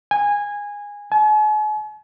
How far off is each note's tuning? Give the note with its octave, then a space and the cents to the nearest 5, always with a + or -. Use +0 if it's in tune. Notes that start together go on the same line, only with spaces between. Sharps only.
G#5 -15
G#5 +45